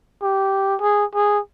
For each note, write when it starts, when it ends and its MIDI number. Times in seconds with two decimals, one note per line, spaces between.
0.22 0.76 67
0.81 1.05 68
1.15 1.39 68